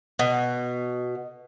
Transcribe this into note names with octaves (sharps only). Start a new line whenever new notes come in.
B2